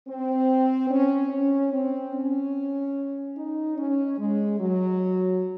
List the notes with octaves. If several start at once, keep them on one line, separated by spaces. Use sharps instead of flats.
C4
C#4
C#4
C4
C#4
D#4
C#4
G#3
F#3